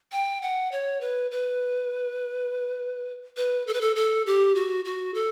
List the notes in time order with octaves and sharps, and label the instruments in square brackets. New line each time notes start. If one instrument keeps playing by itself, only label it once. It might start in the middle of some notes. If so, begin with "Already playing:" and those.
[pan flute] G5
F#5
C#5
B4
B4
B4
A4
B4
A4
A4
G4
F#4
F#4
A4